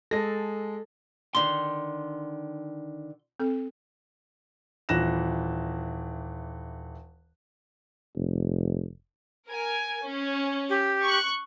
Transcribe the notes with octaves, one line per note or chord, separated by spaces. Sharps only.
G#3 A4 A#6
D3 D#3 C6
C4 A4
D#1 E3 F#6 A#6 E7
F1
A#4 G#5
C#4
G4
C#6 F#6